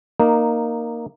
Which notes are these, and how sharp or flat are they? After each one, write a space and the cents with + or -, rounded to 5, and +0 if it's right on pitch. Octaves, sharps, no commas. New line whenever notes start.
A#3 +0 D#4 -15